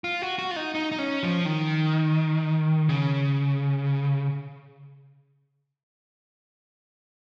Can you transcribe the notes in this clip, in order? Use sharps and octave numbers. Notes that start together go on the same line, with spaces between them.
F4
F#4
F#4
F4
D#4
D#4
D#4
C#4
F3
D#3
C#3